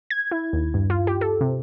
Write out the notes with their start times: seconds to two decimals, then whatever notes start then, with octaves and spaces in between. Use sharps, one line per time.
0.10 G#6
0.31 E4
0.53 D#2
0.74 G2
0.90 F4
1.07 G4
1.21 A4
1.41 C3